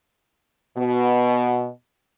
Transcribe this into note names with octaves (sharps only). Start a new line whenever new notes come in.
B2